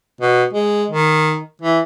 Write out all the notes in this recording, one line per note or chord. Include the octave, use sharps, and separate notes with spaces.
B2
G#3
D#3
E3